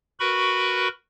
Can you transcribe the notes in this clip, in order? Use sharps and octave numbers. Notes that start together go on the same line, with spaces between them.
F#4 A#4 B4 B5 C#6